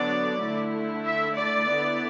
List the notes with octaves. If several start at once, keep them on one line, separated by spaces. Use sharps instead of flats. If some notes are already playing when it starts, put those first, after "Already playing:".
Already playing: D3 F#3 B3 D4 D5
D3 A3 E4
E5
D5
D3 B3 E4